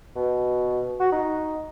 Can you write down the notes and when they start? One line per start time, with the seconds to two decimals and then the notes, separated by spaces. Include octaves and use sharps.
0.16 B2
1.00 F#4
1.13 D#4